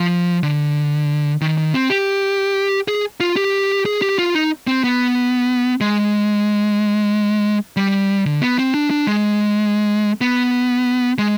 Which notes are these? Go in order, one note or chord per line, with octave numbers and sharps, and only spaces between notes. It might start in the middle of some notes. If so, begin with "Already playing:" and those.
Already playing: F3
D3
D#3
D#3
C4
G4
G#4
F4
G4
G#4
G4
F4
D#4
C4
B3
G#3
G3
D3
B3
C4
D4
D4
G#3
B3
G#3